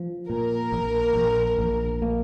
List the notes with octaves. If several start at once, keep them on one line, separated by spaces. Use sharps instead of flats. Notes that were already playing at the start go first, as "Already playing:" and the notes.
Already playing: F3
A#2 A#4
A#1
A#1
A#1
A#3